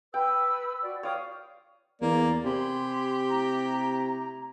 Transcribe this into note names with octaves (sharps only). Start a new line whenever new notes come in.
B4 G5 E6
F#4 D5
C#5 D5 F5 G5 D#6
E2 A#3 G#4 C#5 D5
C3 G4 G#5 B5 C6
A3 E4 A#5